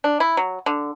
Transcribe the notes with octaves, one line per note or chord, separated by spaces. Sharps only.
D4
E4
F#3
D3